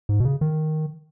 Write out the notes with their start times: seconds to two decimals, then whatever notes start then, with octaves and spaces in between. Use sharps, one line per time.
0.09 G#2
0.20 B2
0.25 C#3
0.41 D#3